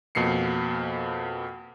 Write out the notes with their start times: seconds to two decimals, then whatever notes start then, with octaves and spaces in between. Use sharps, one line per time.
0.15 F2 B2 A#3 C7 C#7